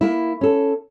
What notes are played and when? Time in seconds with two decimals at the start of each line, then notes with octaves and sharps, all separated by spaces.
0.01 A#3 E4
0.41 C#4 A4